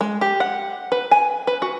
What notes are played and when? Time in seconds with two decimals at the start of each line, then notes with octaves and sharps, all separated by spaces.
0.01 G#3
0.21 G4
0.40 F#5
0.92 B4
1.11 G#5
1.47 B4
1.62 F#4